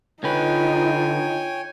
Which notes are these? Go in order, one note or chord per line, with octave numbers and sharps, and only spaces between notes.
D3 D#4 F4 B4 C#5 G5 G#5